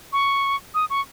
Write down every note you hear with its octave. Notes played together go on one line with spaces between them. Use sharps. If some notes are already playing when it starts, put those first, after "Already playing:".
C#6
D#6
C#6